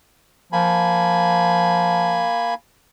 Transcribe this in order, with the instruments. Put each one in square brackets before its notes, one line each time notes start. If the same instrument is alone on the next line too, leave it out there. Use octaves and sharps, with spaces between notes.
[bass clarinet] F3 [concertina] A#3 G#5 B5